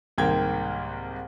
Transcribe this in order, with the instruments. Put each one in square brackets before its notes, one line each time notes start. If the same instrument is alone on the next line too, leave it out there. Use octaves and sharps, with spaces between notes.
[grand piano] C2 G#2 D#3 A#3 G5 G#6